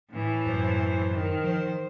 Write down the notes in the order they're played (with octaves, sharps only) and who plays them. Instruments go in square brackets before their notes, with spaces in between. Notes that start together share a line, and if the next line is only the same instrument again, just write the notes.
[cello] A2 E3
[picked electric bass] F#2 [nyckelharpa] C5
[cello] D#3
[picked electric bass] F3 [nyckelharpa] C5